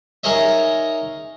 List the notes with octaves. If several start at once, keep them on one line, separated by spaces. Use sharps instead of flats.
D#4 G#4 A#4 C#5 D#5 E5